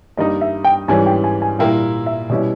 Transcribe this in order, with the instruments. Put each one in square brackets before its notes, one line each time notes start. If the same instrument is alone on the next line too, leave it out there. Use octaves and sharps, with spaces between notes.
[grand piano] G2 G3 A#3 D#4 [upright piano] D#5
[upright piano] E5
G5
[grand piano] G#2 E3 G3 C#4 [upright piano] G#5
[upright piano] G5
G#5
G#5
[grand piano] A#2 G3 A#3 E4 [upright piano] G5
[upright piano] E5
[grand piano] B2 G3 C#4 E4 [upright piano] D#5